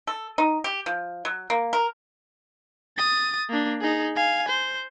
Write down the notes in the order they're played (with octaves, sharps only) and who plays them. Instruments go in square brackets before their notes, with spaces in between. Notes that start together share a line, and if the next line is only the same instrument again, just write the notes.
[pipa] A4
D#4
G4
F3
F#3
A#3
A#4
[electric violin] D#6 A6
A#3 D4
D#4 G#4
F5 G#5
C5